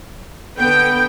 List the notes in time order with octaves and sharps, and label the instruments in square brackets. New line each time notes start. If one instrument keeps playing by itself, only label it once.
[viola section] D3 G5 [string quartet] B3